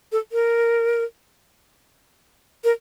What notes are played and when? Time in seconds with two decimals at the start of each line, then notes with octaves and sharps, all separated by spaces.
0.12 A4
0.32 A#4
2.64 A#4